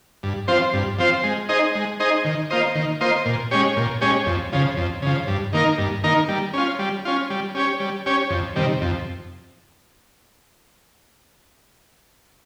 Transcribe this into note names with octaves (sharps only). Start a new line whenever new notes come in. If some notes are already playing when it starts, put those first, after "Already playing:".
G2
F3 C4 F4 C5
G2
F3 C4 F4 C5
G#3
D#4 G#4 C5 D#5
G#3
D#4 G#4 C5 D#5
D#3
A#3 F4 C5 D#5
D#3
A#3 F4 C5 D#5
A#2
G#3 C#4 G4 C#5
A#2
G#3 C#4 G4 C#5
F2
C#3 F3
F2
C#3 F3
G2
D#3 A#3 D#4 A#4
G2
D#3 A#3 D#4 A#4
G3
C#4 F4
G3
C#4 F4
G3
C#4 G4 C#5
G3
C#4 G4 C#5
F2
C3 D#3 G3
F2